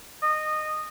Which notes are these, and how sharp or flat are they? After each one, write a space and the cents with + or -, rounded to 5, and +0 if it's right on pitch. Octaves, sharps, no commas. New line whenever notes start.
D#5 -20